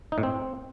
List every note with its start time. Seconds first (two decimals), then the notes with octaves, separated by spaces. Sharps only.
0.12 D#4
0.18 A2
0.23 C4